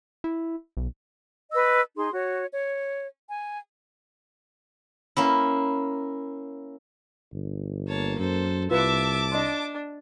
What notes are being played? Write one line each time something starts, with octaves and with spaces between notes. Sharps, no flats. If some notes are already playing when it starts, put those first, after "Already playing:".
E4
B1
B4 D#5 E6
D#4 G#4 C6
F#4 C#5
C#5
G#5
A#3 C#4 E4
G1
A#3 C#5 A5
F#2 A4 C5
C2 F4 B4 E5 A5 D6
D4 D#5 C6